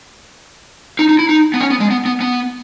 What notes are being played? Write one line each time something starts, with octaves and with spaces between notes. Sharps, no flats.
D#4
D#4
E4
D#4
B3
C#4
B3
G#3
B3
B3
B3